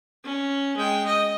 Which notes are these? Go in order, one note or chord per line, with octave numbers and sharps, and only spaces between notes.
C#4
G#3 G5
D#5